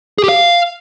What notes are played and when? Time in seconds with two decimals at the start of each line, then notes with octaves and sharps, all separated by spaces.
0.18 G#4
0.24 G4
0.29 F5